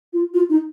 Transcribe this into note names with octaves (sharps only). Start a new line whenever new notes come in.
F4
F4
D#4